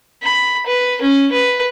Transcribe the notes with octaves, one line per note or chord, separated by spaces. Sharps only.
B5
B4
C#4
B4